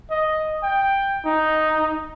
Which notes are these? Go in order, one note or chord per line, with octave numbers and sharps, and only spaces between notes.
D#5
G5
D#4